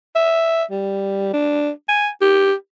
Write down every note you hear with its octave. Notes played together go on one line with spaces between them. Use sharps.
E5
G3
D4
G#5
G4